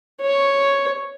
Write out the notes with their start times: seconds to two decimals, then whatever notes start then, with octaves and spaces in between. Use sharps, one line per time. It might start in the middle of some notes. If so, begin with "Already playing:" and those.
0.22 C#5